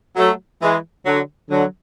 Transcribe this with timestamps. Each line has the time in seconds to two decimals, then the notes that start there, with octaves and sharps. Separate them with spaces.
0.16 F#3 A3
0.61 E3 G#3
1.05 D3 F#3
1.49 D3 F#3